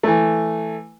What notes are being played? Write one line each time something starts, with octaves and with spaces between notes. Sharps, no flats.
E3 A3